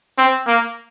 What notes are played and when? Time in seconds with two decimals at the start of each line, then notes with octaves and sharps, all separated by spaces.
0.18 C4
0.47 A#3